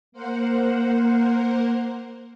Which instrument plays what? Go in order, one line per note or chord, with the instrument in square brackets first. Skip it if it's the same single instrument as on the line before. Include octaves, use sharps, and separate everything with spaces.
[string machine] A#3 A#4 C5 F#5